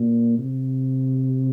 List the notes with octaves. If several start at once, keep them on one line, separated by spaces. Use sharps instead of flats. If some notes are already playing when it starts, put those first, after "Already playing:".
Already playing: A#2
C3